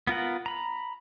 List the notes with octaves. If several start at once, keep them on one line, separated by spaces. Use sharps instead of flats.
B3 F4 A#4 F#5
A#5 B5